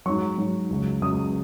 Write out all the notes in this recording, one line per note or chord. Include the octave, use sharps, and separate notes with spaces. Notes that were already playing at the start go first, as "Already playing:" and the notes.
G#2 F#3 C#6
G#2 F#3
C#2 C#3 F#3
C#2 C#3 F#3 D#6